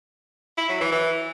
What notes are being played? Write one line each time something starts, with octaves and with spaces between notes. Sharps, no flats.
E4
F#3
E3
E3